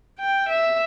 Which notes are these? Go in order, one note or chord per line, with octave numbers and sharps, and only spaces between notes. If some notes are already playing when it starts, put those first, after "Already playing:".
G5
E5